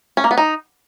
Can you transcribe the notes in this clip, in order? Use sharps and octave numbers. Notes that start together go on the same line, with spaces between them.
C#4
A#3
B3
D#4